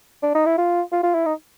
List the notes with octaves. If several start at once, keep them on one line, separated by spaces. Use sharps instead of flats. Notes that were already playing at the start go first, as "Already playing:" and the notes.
D4
D#4
E4
F4
F4
F4
E4
D#4